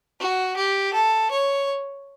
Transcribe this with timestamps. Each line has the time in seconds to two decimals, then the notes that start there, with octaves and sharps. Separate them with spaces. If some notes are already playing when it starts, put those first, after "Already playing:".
0.20 F#4
0.57 G4
0.94 A4
1.31 C#5